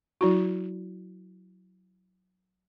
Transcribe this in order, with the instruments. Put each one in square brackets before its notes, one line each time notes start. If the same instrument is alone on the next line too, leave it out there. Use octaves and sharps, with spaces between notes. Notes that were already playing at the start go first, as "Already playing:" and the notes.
[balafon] F#3 E4 F#4